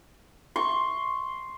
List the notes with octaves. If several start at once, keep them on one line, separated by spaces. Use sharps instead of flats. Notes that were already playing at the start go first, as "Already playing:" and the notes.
C6 C#6